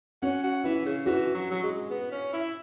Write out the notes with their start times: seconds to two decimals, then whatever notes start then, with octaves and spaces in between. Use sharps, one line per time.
0.22 C#4 F#4
0.43 F#4
0.64 E3 E4
0.86 C#3
1.06 E3 F#4
1.34 F#3
1.51 F#3
1.63 G#3
1.90 B3
2.11 C#4
2.33 E4